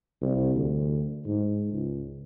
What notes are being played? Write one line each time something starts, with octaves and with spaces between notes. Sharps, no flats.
C2
D2
G#2
C#2